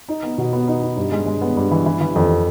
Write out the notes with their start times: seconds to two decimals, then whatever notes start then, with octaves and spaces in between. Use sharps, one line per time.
0.09 D#4
0.23 B3
0.38 B2
0.53 B3
0.68 D#4
0.82 D#4
0.97 G2
1.12 G#3
1.26 G#3
1.42 B3
1.57 G2
1.71 E3
1.86 E3
2.01 E3
2.16 F2